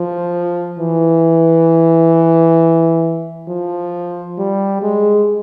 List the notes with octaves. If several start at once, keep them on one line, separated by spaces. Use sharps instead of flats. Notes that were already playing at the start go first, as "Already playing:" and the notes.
Already playing: F3
E3
F3
G3
G#3